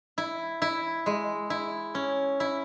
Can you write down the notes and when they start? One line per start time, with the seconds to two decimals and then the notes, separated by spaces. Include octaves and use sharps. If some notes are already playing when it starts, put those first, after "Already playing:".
0.18 E4
0.62 E4
1.06 G#3
1.50 E4
1.95 C#4
2.40 E4